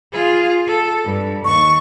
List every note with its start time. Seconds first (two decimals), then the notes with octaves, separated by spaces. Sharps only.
0.12 F4 G#4
0.67 A4
1.05 G2
1.45 D#2 C#6